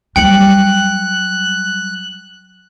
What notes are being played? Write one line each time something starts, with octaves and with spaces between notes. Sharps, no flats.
F#3 G3 G5 F#6 C#7 F#7